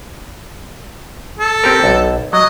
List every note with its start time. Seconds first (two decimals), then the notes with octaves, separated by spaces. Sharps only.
1.39 A4
1.64 C4 G4 A#4
1.84 B1
2.33 F#3 D#5